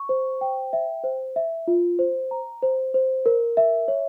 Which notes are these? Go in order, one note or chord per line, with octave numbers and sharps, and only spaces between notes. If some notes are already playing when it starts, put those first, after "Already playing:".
Already playing: C#6
C5
G5
E5
C5
E5
F4
C5
A#5
C5
C5
A#4
E5
C#5